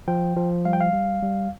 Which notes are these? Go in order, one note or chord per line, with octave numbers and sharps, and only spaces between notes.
F3 G5
F3
G3 F5
G5
F5
G3
G3